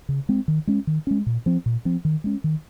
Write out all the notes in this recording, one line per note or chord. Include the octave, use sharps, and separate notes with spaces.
C#3
G#3 C4
D#3
G#3 C#4
D#3
G#3 C#4
A#2
F3 C4
A#2
F3 C4
D#3
G#3 C#4
D#3